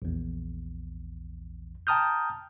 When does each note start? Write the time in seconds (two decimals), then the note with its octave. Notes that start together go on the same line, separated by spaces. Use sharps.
0.02 A#1 E2
1.87 G5 A5 A#5 D#6 F6 G6